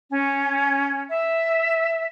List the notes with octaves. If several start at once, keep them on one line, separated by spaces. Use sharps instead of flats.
C#4
E5